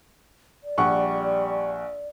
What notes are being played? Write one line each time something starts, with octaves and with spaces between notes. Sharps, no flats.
D5
A#1 G3 F#5 C#6